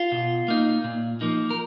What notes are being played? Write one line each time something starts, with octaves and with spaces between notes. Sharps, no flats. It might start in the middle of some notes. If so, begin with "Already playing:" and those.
Already playing: F4
B2
A#3 D#4
A#2
F3 A#3 D#4
A#4